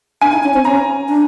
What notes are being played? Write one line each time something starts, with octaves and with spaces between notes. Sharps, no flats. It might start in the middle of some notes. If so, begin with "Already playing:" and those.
D4 G#5
D#4
C#4
C4
C#4 A#5
D4